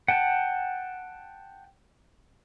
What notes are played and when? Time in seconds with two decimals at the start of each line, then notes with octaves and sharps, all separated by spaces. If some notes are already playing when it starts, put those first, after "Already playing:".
0.08 F#5 G5 A5